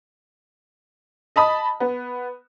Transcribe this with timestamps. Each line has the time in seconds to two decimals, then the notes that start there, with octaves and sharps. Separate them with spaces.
1.36 D#5 A5 B5 D#6
1.80 B3